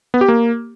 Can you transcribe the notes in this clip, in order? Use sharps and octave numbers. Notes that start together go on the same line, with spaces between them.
B3
G4
A#3